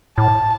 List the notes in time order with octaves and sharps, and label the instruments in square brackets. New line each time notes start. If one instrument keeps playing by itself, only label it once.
[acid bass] A2 [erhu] A5